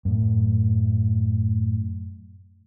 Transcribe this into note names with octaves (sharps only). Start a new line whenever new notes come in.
F#2 A2